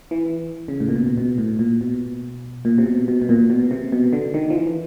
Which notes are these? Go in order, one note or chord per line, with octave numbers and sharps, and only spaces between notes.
E3
C#3
A2
A#2
B2
A#2
B2
A2
A#2
B2
A#2
C3
B2
B2
B2
A#2
B2
C3
B2
D3
D#3
F3
E3